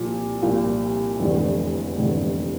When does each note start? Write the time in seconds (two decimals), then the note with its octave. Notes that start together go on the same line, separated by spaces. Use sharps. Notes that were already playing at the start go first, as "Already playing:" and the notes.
Already playing: C2 A#2 F3
0.42 C2 A#2 F3
1.20 F1 E2 D3 G3
1.97 F1 E2 D3 G3